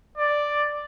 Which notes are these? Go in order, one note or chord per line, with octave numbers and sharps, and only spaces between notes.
D5